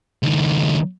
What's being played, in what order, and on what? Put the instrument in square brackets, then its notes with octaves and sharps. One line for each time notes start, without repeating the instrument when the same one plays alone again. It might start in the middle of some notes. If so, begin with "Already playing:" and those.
[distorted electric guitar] C#2 D#3